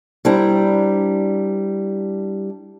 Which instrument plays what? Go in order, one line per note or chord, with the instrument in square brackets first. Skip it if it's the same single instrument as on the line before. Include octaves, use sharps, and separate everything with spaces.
[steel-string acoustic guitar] G3 D4 E4 C5 A#5